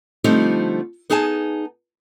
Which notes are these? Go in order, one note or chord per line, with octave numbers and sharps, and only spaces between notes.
D3 F3 G3 A3 C4 D#4
B3 D#4 G#4 G#5 A5